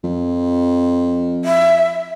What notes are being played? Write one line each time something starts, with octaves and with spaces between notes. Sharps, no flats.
F2
E5